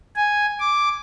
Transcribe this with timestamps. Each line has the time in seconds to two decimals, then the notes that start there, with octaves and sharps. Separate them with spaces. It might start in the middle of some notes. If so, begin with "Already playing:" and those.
0.16 G#5
0.60 D6